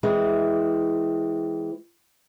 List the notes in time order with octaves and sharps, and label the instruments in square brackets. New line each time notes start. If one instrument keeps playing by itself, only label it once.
[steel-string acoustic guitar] E3 G#3 C4